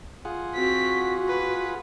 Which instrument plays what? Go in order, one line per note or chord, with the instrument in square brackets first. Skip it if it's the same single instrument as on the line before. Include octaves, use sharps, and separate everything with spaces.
[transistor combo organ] F4 G#4 F#5
[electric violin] C4 B6 [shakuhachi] F#4
[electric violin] B4